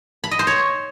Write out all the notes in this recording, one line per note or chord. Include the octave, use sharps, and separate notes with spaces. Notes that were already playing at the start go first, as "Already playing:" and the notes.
B5
D#5
C5
C#5